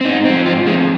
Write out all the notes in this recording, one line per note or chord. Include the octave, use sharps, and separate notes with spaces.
C4
G#2 D#4
F3 C4
G#2 F4
F3 C4 G#4